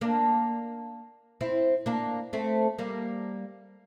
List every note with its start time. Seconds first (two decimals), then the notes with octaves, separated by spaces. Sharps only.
0.01 A#3 D4
1.41 C4 E4
1.86 A#3 D4
2.33 A3 C4
2.79 G3 A#3